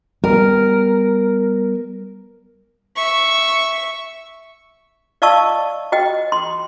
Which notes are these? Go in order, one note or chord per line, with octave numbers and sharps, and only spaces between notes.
G3 B3 A#4
E5 C#6
D5 D#5 F5 A5 C#6 E6
F#4 D#5 G5
C6